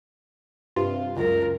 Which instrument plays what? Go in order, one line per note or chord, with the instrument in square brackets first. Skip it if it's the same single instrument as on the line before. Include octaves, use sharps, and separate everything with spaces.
[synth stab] G2 C3 F4
[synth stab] C#2 F#2 [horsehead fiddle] F4 A#4